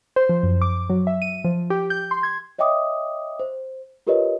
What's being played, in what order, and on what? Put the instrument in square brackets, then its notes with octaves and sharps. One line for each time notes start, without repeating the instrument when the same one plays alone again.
[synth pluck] C5
F3
F#2
D6
F#3
E5
D#7
F3
G4
G6
C6
G#6
[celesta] C#5 D#5 E5 G5 D6 D#6
C5
F4 G4 A#4 B4 C#5 D#5